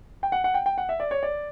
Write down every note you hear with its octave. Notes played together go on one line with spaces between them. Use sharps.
G5
F#5
F#5
G5
G5
F#5
E5
D5
C#5
D5